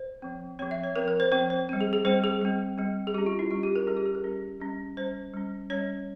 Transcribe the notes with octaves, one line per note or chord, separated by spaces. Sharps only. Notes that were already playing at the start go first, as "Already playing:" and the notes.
Already playing: C5
F3 C4
F3 C4 C#5
E5
C#5
F3 C4 A#4
A#4
C5
F3 C4 C5
C5
G3 C4
G#4
G#4
G3 C4 C5
G#4
G3 C4
G3 C4
G#4
G3 C#4 G4
F4
E4
G3 C#4 F4
G4
A#4
G3 C#4 G#4
G4
G#4
A#4
G3 C#4 G#4
G3 C#4
G3 C#4 C5
G3 C#4
G3 C#4 C#5